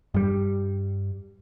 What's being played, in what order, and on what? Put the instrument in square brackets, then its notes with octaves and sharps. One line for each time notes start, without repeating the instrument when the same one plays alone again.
[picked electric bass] G2 G3